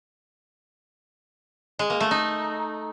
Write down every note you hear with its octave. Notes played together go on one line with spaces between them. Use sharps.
G#3
A#3
A3
D#4